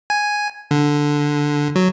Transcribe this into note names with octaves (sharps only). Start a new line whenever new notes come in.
G#5
D3
F#3